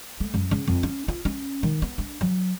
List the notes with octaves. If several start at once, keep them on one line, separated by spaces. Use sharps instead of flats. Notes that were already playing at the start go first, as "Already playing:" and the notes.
A3
F#2
C#3
F2
C#4
F4
C#4
D#3
B3
D4
F#3